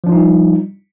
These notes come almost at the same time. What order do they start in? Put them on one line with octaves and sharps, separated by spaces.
F3 D4 F4 D#4 G3